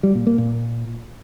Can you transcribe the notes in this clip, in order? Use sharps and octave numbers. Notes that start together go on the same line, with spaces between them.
G3
A#2
A#3
A#2